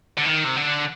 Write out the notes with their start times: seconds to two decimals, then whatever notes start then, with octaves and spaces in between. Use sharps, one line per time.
0.18 D3
0.26 D#3
0.45 C3
0.57 D3